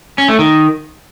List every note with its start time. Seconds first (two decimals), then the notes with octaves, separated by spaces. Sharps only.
0.18 C#4
0.29 A3
0.39 D#3